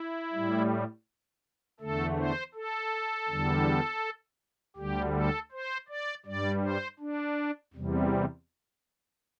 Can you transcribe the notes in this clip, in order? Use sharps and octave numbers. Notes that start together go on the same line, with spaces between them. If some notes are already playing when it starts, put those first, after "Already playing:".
Already playing: E4
A2 G3
E2 D3 A3 A4
C5
A4
E2 D3 G3
D2 D3 G3 G4
A4
C5
D5
G2 G3 D5
C5
D4
E2 C3 G3